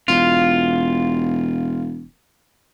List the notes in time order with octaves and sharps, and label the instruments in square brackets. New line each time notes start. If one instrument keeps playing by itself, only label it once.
[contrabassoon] E1 [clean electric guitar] F4